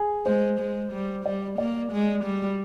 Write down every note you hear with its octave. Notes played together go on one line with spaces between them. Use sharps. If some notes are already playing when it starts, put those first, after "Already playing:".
Already playing: G#4
G#3 C5
G#3
G3
G3 D5
A#3 D5
G#3
G3